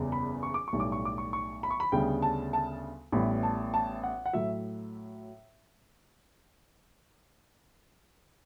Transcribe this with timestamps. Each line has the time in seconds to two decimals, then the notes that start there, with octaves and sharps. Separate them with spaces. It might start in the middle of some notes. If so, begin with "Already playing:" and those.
Already playing: F#1 E2 C#3 G3 B3
0.12 B5
0.43 C#6
0.54 D6
0.68 C#6
0.73 B1 A2 G3
0.80 D6
0.92 C#6
1.05 D6
1.18 C#6
1.33 C#6
1.63 B5
1.71 C#6
1.80 B5
1.92 D2 C#3 G3 B3 G5
2.22 A5
2.53 A5
3.12 A1 A2 G3 B3 B5
3.43 A5
3.74 A5
4.04 F#5
4.26 F#5
4.33 A2 F#3 E5